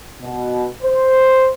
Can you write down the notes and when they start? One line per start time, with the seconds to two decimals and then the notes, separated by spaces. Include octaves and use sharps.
0.22 B2
0.83 C5